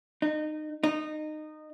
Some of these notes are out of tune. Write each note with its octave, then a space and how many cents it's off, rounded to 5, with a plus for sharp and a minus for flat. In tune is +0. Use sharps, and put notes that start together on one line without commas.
D#4 -25
D#4 -20